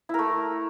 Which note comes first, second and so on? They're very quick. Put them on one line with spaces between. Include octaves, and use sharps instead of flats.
E4 A#4 A3